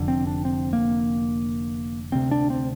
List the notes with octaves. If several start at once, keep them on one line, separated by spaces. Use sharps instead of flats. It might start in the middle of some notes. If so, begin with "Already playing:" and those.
Already playing: F1 F2 D3
C4
D4
C4
A#3
D2 C3 C4
D4
C4